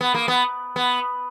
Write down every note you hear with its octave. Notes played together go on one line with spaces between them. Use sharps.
B3
A#3
B3
B3